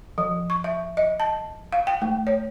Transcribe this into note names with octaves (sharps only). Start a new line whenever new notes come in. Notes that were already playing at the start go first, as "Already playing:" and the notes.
F3
C#6
E5
D#5
A5
F5
G5
A3
C#5